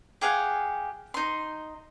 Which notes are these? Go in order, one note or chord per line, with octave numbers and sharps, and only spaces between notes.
G4 G#4 F5 F#5
D#4 C6